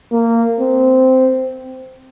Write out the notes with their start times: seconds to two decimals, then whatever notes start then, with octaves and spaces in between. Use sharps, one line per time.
0.12 A#3
0.60 C4